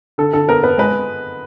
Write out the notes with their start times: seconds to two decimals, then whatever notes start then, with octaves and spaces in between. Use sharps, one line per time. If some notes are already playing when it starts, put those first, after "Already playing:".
0.18 D3 A4
0.33 D3 A4
0.49 B3 A#4
0.63 B3 B4
0.78 G#3 B4